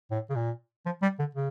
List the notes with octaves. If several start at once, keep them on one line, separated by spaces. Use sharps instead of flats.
A2
C#3
A#2
F3
G3
D3
C#3